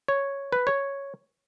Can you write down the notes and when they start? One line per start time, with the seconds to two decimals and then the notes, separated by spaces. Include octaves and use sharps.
0.08 C#5
0.52 B4
0.67 C#5